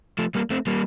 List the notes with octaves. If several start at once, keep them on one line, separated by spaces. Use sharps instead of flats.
F3 A3
G3 A#3
A3 C4
G3 A#3